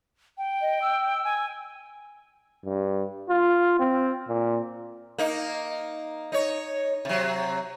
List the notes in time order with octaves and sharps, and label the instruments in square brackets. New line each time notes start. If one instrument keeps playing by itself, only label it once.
[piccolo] G5
[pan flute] D#5
E6
[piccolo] G#5
[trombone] G2
F4
C4
A#2
[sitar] A#3 D#4
D#4 C#5
C3 F#3